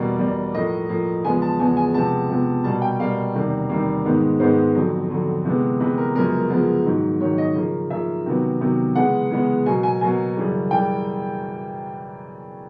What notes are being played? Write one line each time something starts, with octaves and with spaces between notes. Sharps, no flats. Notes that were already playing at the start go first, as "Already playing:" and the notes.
Already playing: E2 B2 G3 A#3 D5
E2 B2 G3 A#3
A2 F3 A#3 D#5
A2 F3 A#3
E2 C#3 F3 G#3 B3 G#5
A5
E2 C#3 F3 G#3 B3 G#5
G#5
C3 F3 G#3 B3 A5
C3 F3 G#3 B3
B2 G3 A#3 A5
G5
B2 G3 A#3 F5
E2 C3 D#3 G3 A#3
E2 C3 D#3 G3 A#3
G#2 D#3 G#3 B3
G#2 D#3 G#3 B3 C5
F2 D3 F#3
F2 D3 F#3
C3 E3 G#3 B3
C3 E3 G#3 B3 B4
A#4
F#2 C#3 F3 G#3 B3 A#4
F#2 C#3 F3 G#3 B3
G#2 D#3 F#3
G#2 D#3 F#3 C#5
D#5
C#3 F3 A#3
C#3 F3 A#3 E5
C3 D#3 F#3 B3
C3 D#3 F#3 B3
C#3 E3 G#3 B3 F#5
C#3 E3 G#3 B3
B2 F#3 A#3 G#5
G#5
B2 F#3 A#3 G#5
F#2 C#3 E3 G3
C#3 E3 G3 G5